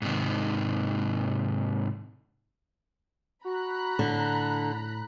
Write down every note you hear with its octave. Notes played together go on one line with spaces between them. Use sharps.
G#2 C3 D#3
F#4 A#5 B5 F#6
A2 D3